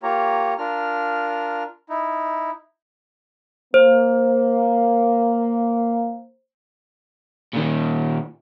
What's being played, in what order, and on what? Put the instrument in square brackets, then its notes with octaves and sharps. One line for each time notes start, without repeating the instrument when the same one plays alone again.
[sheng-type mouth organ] A#3 F4 G4 C#5 A#5
D4 F4 A#4 F6
D#4 E4
[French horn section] A#3 [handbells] C5
[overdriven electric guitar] A#2 D#3